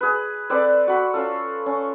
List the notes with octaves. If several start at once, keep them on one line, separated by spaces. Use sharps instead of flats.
G#4 B4
C4 A4 B4 D5
F#4 B5
C#4 F4 A4
C#4